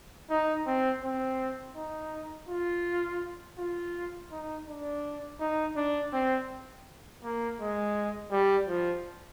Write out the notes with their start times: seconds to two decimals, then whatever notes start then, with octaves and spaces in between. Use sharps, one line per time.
0.30 D#4
0.66 C4
1.03 C4
1.75 D#4
2.48 F4
3.58 F4
4.31 D#4
4.67 D4
5.40 D#4
5.76 D4
6.13 C4
7.22 A#3
7.59 G#3
8.31 G3
8.68 F3